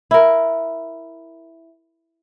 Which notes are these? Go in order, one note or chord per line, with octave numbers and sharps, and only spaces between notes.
E4 A#4